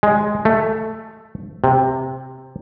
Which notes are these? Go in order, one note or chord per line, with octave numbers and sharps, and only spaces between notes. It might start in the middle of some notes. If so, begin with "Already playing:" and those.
G#3
A3
C3